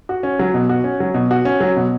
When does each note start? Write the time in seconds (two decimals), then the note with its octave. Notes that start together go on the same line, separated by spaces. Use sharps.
0.09 F#4
0.23 C#4
0.39 F#3
0.54 B2
0.69 F#4
0.84 C#4
1.00 F#3
1.14 B2
1.31 F#4
1.45 C#4
1.60 F#3
1.76 B2